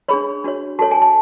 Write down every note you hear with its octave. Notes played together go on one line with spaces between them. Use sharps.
D4 G#4 C#5 B5
D4 F#4 C#5
F#4 A4 C#5 A5
G#5
A5